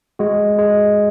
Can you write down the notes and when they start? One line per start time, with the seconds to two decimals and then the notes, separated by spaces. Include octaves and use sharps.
0.19 G#3 F#4
0.58 G#3